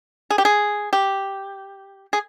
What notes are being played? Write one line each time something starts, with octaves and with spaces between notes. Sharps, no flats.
G#4
G4
G#4
G4
G#4